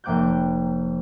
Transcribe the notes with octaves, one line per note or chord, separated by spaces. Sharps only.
F1 A#3 G5 D6 F#6 G6